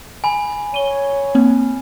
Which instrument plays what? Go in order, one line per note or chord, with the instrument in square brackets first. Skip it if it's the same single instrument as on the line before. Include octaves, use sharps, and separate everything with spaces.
[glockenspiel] G#5 B5
[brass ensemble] C#5 [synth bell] D#7 G7
[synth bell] A#3 C4